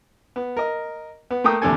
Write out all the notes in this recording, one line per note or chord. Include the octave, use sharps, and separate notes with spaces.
B3
A#4 D#5
B3
A3 A#3 A#4 G5 D#6
A1 D#2 C3 D4 A4 G#5